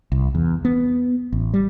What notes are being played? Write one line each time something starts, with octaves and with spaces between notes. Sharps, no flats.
C2
E2
B3
A1
G3